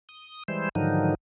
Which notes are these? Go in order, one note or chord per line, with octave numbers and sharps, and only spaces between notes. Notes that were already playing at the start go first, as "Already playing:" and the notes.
D#6
E3 G3 G#3 C5
G#2 D3 D#3 F3 F#3 D#4